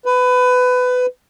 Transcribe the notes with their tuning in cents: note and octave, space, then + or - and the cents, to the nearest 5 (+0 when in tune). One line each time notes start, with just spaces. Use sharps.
B4 +20